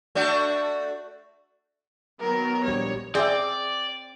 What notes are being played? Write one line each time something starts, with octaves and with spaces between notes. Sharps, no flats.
A3 D4 F#4
D#3 F#3 B3 A#4
A#1 G3 C#5
C4 G#4 D5 E5